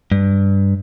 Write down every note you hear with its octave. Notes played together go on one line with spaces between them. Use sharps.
G2